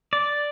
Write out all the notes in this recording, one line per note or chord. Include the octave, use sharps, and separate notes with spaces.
D5